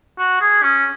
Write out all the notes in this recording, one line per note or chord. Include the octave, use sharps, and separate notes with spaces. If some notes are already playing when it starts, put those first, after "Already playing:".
F#4
G#4
C#4